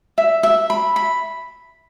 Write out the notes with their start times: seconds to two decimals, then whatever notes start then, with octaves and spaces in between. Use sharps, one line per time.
0.18 E5
0.43 E5
0.70 B5
0.96 B5